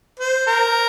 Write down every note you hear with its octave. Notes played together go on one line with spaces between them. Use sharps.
C5
A#4